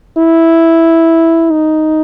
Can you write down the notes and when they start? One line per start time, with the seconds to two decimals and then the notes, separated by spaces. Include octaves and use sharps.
0.18 E4
1.50 D#4